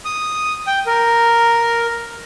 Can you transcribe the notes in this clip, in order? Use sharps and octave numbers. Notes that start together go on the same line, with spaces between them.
D#6
G5
A#4